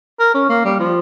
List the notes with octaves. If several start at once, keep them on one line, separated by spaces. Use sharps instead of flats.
A#4
C#4
A#3
G3
F3